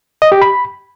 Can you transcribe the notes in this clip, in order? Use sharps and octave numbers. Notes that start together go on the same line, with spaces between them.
D#5
G4
B5